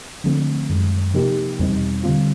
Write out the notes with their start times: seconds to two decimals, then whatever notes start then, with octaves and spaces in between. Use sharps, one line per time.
0.24 D3 F3 A3 C4
0.69 F#2 D#3 G#3
1.14 C3 F3 A#3 D#4 G4
1.59 E2 B2 G3 C4 D#4
2.03 D3 G3 C4 F4